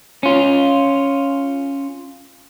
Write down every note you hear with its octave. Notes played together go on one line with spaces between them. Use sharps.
C#4 F4